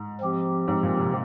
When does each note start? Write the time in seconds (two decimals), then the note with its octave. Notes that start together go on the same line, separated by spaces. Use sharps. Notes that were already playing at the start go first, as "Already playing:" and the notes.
Already playing: G#2
0.21 F3 C4 G4
0.68 G#2
0.83 A#2
0.97 C3